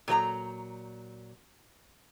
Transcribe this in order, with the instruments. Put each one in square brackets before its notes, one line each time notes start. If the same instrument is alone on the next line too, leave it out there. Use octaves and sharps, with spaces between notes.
[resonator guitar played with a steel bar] A#2 F#3 A#4 A#5